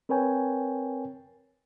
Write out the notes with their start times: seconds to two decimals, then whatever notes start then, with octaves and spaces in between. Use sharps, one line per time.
0.09 C4 A#4 B4 C#5 G5 G#5